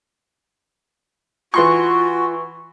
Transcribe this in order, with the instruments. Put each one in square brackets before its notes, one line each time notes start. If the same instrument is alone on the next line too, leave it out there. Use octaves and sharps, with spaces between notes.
[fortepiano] E3 C6 C#6 [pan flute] F4 [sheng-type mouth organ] F#4